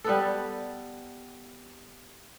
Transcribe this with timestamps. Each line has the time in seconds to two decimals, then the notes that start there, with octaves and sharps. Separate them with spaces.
0.04 G3 B3 A4